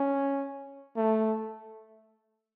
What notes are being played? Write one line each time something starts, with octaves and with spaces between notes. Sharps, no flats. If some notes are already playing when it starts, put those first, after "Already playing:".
Already playing: C#4
A3